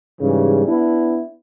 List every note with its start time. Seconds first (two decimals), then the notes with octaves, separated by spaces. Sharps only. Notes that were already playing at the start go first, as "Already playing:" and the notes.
0.20 G#2 C#3 E3 G3
0.66 B3 D4 E4